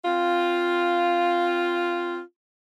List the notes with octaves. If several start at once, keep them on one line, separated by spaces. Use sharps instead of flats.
C4 F4